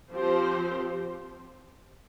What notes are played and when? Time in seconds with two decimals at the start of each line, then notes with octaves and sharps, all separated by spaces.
0.11 F3 C4 G4 C5